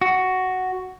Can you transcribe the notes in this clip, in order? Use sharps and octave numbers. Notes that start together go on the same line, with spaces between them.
F#4